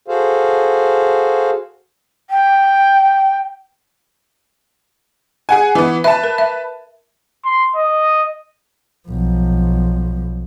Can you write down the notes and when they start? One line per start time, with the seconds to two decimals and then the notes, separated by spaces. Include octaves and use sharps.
0.08 F#4 G#4 A4 C5 F5
2.30 G5
5.49 G#4 F#5 G#5
5.75 E3 B3
6.04 B4 E5 A5
6.24 A#4
6.38 E5
7.45 C6
7.76 D#5
9.08 B1 F3